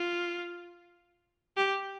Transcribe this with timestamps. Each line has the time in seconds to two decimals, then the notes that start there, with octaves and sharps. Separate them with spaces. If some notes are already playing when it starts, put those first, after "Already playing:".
Already playing: F4
1.57 G4